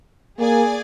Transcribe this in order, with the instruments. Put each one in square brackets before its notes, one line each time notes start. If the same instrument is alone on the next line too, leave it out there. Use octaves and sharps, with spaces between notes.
[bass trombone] A#3 [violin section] G#4 D5 G#5